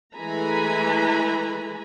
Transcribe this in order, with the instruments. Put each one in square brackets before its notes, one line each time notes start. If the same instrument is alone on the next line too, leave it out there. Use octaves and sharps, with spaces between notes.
[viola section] E3 G#3 A3 G#5 A#5 B5